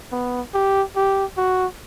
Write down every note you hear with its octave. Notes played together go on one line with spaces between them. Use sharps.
B3
G4
G4
F#4